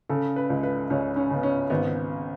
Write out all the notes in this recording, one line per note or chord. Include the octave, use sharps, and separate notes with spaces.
C#3 A4
B4
C#2
B4
C#2 C#4
C#4
C#3 B3
C#4
G#1 B3